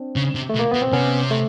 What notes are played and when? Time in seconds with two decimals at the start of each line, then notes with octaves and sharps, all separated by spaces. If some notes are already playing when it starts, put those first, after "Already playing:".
Already playing: C4 D4
0.16 C#3
0.35 C3
0.49 A3
0.55 B2
0.59 A#3
0.71 B2 B3
0.82 C4
0.92 C3 B3 C#4
1.31 A3